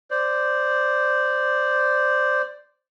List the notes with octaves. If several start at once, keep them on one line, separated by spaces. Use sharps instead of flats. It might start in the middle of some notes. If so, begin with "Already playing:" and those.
C5 D5